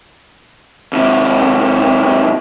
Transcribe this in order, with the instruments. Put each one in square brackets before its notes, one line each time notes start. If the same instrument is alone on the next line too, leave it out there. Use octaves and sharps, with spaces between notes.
[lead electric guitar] D#2 C3